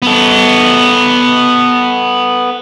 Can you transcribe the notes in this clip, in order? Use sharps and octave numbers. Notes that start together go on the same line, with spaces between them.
B3 A4